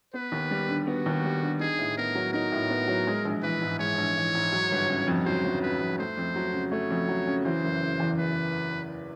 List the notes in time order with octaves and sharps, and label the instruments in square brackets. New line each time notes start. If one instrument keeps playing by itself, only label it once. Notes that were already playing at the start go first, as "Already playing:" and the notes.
[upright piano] B3 [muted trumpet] B4
[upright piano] D#2
G3
D3
[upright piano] B3 [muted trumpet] F#4
[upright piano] D#2
G3
D3
[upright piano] D#4 [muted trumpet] G#4
[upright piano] A2
[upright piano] B3 [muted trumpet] A#4
[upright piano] F#3
[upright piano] D#4 [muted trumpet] A#4
[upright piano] A2
B3
F#3
G#3
A#1
[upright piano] E3 [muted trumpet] B4
[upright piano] G#2
[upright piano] G#3 [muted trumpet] C#5
[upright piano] A#1
E3
G#2
F#3
G1
C#3
F2
[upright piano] F#3 [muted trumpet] C5
[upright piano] G1
[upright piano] C#3 [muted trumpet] B4
[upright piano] F2
[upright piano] A3 [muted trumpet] C5
[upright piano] F2
F#3
C#3
[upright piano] A3 [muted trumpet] C#5
[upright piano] F2
F#3
C#3
[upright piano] E3 [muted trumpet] C5
[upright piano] F#1
C#3
E2
[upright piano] E3 [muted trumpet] B4